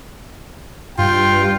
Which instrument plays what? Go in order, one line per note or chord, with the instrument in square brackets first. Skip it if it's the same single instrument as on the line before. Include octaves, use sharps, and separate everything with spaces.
[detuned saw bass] G2 [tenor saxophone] F4 [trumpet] G5